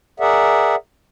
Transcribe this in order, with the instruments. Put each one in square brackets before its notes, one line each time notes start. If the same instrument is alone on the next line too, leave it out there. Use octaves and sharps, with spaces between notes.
[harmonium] G#4 A#4 D5 E5 F#5